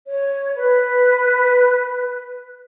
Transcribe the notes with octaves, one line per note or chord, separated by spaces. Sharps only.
C#5
B4